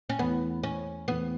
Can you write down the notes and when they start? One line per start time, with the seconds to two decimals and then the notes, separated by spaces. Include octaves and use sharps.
0.09 C#4
0.19 E2 E3 A3 B3 E4
0.63 C#4
1.07 E2 E3 A3 B3 E4